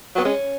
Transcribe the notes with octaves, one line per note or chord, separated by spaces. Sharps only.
F#3 B3
G#3 C#4